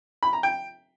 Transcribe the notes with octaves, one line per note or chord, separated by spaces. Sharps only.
B5
A#5
G5